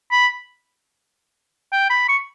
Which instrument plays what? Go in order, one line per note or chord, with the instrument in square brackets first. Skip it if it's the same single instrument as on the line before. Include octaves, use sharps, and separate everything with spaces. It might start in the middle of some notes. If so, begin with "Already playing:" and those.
[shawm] B5
G5
B5
C#6